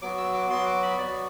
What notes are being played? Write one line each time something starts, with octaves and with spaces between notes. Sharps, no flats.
F#3 B3 F#4 D6
E6
D6
F#3 B3 F#4 C6
D6
B5
F#3 B3 F#4 D5